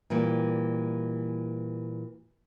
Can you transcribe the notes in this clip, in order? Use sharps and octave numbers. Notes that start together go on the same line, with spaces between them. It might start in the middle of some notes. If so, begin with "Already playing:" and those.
A#2 E3 G3